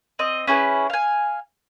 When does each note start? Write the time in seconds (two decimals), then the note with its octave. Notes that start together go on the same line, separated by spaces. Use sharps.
0.19 C4 D#5
0.47 C#4 E4 G#4 B4
0.90 F5 G#5